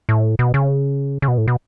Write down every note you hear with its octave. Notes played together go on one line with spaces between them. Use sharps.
A2
B2
C#3
C#3
B2
A2
B2